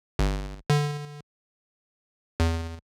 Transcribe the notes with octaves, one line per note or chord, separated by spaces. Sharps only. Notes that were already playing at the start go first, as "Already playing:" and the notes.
G1
D3
E2